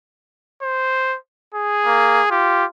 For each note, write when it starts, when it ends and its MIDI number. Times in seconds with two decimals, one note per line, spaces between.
0.62 1.17 72
1.54 2.28 68
1.86 2.22 58
2.31 2.66 65
2.31 2.65 67